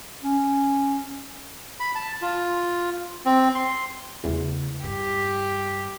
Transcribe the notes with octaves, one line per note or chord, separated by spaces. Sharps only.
C#4
B5
A5
F4
C4
C6
E2 C#3 A3
G2 G4